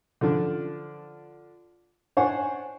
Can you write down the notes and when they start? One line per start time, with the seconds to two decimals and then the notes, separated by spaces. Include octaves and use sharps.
0.21 D3 F3 D4
2.17 D4 C5 C#5 F#5 G#5 C#6